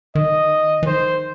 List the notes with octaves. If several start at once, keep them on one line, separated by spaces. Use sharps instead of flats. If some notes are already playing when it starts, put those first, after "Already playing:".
D#3 D#5
E3
D#3 C5